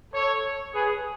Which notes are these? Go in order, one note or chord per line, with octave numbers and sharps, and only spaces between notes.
A4 C#5
G#4 B4